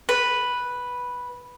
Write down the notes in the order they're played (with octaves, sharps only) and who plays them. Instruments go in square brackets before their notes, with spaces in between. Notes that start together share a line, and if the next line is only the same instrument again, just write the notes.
[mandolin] B4